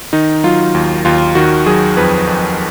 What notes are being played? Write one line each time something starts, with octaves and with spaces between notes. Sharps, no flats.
D#3 D#4
F#3 F4
D#2
D#2 F4
D#3 F#4
F#3 G#4
F2 B4
F2